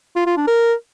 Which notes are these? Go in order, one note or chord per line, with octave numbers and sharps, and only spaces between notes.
F4
F4
D4
A#4